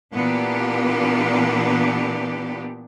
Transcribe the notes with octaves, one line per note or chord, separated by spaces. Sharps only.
A#2 E3 B3 D4 G4